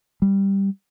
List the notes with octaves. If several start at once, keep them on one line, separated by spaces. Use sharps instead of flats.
G3